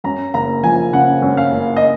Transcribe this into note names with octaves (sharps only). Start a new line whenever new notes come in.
F#2 A#5
F#1 A#5
F3 G#5
C#3 F#5
F#2
F5
F#1
D#5